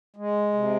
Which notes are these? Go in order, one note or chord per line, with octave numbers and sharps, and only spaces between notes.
G#3
C3